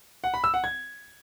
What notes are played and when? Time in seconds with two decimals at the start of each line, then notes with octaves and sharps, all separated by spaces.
0.24 F#5
0.34 B5
0.44 E6
0.54 F#5
0.64 G#6